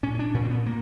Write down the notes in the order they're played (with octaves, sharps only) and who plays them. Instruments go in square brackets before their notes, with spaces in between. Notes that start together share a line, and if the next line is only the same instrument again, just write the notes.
[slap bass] A#2 C#4
D4
A#2 C#4
C4
B3
A#2 A#3